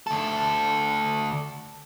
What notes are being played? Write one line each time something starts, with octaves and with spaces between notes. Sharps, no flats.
D2 A4